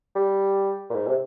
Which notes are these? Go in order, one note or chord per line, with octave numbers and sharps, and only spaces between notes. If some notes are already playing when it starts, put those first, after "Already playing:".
G3
A#2
G#2
C3